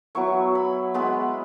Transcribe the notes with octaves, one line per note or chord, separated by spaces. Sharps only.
F#3 B3 E4 C#6
B5
G#3 B3 E4 B5